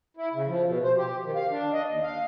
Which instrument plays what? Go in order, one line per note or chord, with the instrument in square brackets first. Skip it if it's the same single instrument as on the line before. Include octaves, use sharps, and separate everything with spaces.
[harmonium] E4
C#3
F3
B2
C5
G4
D#3
F5
D4
D#5
D#2
F5